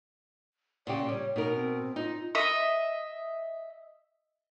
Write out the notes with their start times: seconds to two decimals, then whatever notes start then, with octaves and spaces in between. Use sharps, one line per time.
0.87 A#2 C#3 G4 D5
1.09 G3 C#5
1.36 B2 D#4 A#4
1.56 C4
1.96 D#4 F4
2.35 D#5 E5